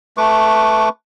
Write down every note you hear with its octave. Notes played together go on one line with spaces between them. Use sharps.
A3 B4 C#6 D6